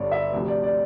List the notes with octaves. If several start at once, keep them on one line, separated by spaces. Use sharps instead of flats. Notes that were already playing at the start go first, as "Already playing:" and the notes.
Already playing: G1 G2 D3 C#5 D5
E5
D2 C3 F3
D5
D5